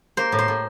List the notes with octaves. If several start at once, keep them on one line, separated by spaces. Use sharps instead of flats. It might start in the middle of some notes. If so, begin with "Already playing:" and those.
A#3 C5
A2
C5
A2